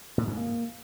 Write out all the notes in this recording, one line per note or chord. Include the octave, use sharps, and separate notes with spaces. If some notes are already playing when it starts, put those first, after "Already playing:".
A2
G#2
A#3